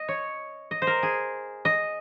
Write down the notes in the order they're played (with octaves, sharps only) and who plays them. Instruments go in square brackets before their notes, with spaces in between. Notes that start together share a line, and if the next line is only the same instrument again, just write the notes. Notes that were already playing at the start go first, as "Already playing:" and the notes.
Already playing: [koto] D#5
C#5
D#5
C5
A#4
G#4
D#5